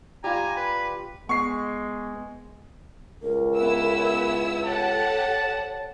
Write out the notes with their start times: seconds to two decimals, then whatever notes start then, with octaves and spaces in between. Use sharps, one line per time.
0.24 G3 F4 G#5 A#5
0.57 B4
1.29 G#3 B3 C#6 C7
3.22 C#2 A#4
3.56 B3 E4 E6
4.65 G4 A4 C#5 F#5 A5